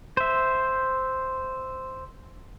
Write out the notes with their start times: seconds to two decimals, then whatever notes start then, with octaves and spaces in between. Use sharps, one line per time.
0.17 C5 E5